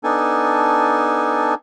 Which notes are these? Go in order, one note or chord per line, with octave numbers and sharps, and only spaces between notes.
B3 D4 D#4 A4 G#5